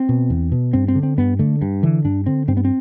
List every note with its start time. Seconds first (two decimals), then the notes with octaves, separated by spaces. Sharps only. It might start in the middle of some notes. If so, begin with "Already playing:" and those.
Already playing: C4
0.09 B2
0.30 E2
0.52 B2
0.73 G2 C4
0.88 C4
0.95 D3
1.03 C4
1.18 G2 B3
1.39 D3 A3
1.62 G2
1.83 D3 E3
2.05 G2 D4
2.26 D3 C4
2.48 G2 C4
2.57 B3
2.65 C4